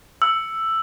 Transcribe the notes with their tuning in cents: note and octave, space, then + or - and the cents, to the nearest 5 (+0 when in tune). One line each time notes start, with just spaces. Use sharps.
E6 +5